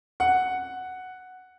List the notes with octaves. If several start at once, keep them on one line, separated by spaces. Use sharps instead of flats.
F#5